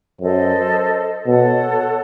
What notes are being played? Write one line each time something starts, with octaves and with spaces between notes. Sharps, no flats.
F#2 A4 C5 D#5
B2 A4 C#5 F#5